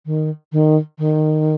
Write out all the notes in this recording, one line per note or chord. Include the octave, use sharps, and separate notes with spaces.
D#3
D#3
D#3